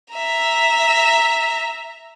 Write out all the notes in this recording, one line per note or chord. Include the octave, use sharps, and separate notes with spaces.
E5 A#5